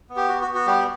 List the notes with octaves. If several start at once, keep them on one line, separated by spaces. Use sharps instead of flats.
B3
G4
F#4
F#4
B3
F#4
G3 G4